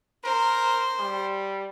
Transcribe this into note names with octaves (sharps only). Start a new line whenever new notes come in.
A#4 C5
G3